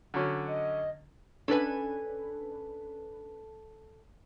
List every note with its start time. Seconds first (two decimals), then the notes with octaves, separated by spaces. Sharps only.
0.14 D3 F#3 C#4
0.48 D#5
1.48 C#4 D4 A4 B4 G#5